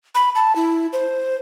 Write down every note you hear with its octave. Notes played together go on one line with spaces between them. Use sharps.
B5
A5
E4
C5